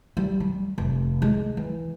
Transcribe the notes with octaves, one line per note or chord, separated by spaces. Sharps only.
G3
G3
F1
G#3
E3